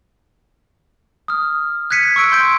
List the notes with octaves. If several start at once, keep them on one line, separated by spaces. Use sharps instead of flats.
D#6 F6
F#6 G#6 B6 C#7 D#7
C#6 E6 D7
C6 G6 D7